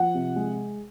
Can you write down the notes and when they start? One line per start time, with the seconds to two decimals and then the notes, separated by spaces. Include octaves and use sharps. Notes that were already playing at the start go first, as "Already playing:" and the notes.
Already playing: F3 F#5
0.14 C3
0.36 G#3